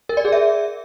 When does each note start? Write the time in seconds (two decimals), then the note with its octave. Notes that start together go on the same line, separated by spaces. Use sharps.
0.09 A#4
0.17 D5
0.25 G#4
0.32 E5